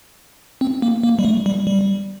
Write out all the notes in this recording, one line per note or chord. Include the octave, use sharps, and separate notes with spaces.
C4
A#3
A#3
G3
A3
G3
G3